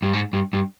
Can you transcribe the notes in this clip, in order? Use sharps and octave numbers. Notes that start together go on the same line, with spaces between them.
G2
G#2
G2
G2